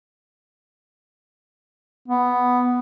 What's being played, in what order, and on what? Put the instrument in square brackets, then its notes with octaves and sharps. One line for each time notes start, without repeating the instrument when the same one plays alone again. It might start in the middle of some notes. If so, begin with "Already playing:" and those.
[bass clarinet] B3